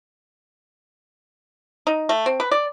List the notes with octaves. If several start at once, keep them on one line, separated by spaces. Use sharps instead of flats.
D#4
A3
C4
B4
D5